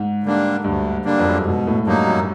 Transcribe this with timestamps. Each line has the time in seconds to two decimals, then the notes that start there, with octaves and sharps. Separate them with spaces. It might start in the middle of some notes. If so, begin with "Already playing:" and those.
Already playing: G#2
0.24 D3 G3 A#3 D4
0.64 D2 G2
1.05 D3 G3 A#3 D4
1.19 F2
1.29 F#2
1.37 G2
1.46 G#2 B2
1.67 A2
1.87 G2 F#3 A#3 D#4
2.07 F#2